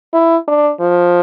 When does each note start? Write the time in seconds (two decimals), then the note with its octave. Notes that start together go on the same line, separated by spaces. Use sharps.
0.13 E4
0.48 D4
0.81 F3